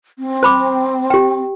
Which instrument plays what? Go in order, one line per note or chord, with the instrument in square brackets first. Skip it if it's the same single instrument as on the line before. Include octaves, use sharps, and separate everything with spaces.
[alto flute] C4
[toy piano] C5 B5 D6
G4 G5